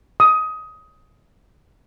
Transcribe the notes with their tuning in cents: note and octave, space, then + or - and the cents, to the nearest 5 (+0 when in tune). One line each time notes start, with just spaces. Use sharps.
D#6 +15